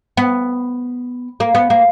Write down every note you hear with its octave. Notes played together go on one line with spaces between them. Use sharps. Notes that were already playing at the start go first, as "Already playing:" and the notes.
B3
A#3
B3
A#3